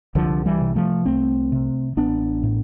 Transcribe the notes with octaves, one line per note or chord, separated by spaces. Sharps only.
C2 D3 F3
E3 G3
C3
F3 A3
C2 A3 C4
C3
A1 B3 D4
A2